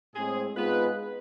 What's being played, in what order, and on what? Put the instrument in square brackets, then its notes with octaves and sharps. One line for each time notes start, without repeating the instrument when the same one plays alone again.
[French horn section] A2 G#3 C4 [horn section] G#4
[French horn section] G#2 G#3 B3 F4 [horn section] B4